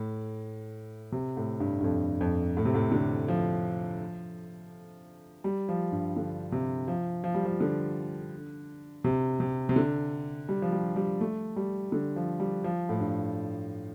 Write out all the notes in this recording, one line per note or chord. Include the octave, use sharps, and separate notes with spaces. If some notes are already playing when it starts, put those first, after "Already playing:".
Already playing: A2
C3
A2
G2
G2
F2
F2
A2
C3
A2
D3
F3
G3
F3
G2
D3
C3
F3
F3
G3
F3
D3
C3
C3
C3
D3
G3
F3
G3
G3
A3
G3
D3
F3
G3
F3
A2
G2